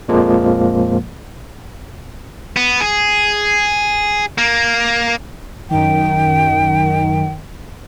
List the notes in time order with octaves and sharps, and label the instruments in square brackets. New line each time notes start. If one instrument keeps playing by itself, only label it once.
[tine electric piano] F2 A#2 F3 G#3 A#3
[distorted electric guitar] B3
G#4
A#3
[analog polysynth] F#2 D#3 [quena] G5